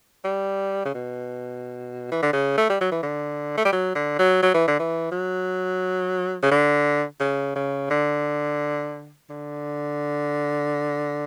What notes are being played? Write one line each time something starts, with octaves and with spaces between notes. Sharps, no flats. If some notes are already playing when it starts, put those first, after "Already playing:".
G3
C#3
B2
E3
D3
C#3
A3
G3
F#3
E3
D3
A3
G3
F#3
D3
F#3
F#3
E3
D3
E3
F#3
C#3
D3
C#3
C#3
D3
D3